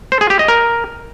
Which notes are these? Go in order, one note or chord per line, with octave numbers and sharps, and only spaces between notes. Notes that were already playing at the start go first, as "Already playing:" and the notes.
C5
G#4
G4
D#5
A#4